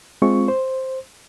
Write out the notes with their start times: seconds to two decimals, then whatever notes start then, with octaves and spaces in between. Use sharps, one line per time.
0.22 G#3 C4 F4 C#6
0.48 C5